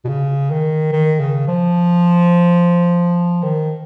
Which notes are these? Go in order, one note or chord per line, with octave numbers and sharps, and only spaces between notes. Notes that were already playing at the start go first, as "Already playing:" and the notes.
B2
C#3
D#3
D#3
C#3
F3
D#3